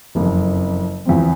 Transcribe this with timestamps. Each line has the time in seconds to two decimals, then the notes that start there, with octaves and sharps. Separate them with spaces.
0.15 F#1 F2
1.05 E2 F3 C4